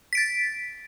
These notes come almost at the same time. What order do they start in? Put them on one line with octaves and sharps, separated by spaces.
B6 D7 A6